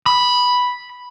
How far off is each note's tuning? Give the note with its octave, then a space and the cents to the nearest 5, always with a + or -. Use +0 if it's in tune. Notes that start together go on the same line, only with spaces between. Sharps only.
B5 -5